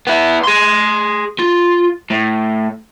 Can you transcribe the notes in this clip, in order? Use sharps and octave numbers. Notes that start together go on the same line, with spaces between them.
B3 E4
G#4 C6
F4
A2